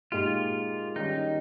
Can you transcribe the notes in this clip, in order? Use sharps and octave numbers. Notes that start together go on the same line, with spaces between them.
A#2 G#3 D#4 F4 G4
D#3 G3 C#4 D#4 G4